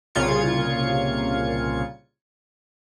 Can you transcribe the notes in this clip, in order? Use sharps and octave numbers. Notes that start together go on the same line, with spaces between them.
C2 A#2 C#3 F4 G#6 C#7